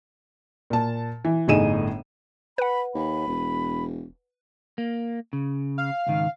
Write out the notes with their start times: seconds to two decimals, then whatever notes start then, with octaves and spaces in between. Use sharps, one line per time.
0.70 A#2 A5
1.24 E3
1.48 G1 A2 D#4 G#4 D#7 E7
2.58 B4 F#5 B5
2.94 D#2 B5
3.27 E1
4.78 A#3
5.33 C#3
5.78 F5
6.07 C#2 G#2 D#3